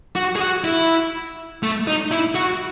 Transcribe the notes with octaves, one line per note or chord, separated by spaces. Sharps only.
F#4
G#4
F#4
E4
A3
D#4
E4
F#4